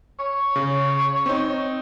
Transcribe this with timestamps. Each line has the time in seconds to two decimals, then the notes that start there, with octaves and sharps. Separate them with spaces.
0.19 C#5
0.56 C#3
1.26 C4 D#4